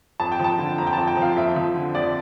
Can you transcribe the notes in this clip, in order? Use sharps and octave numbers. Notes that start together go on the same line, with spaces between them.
F2 A5
G5
F3 A5
D3
F2 A#5
G5
F2 A5
G5
F3
F5
F2 E5
F3
D3
F2 D5